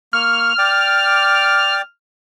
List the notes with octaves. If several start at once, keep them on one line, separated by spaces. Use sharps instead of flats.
A#3 C#6 F6
D5 G5 D6